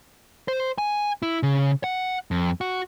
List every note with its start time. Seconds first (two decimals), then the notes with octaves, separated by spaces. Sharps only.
0.48 C5
0.78 G#5
1.23 E4
1.43 C#3
1.84 F#5
2.31 F2
2.61 F#4